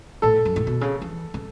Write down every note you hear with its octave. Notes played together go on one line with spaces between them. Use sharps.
A2 A4
F#2
A2
B2
C#3
E3
C#3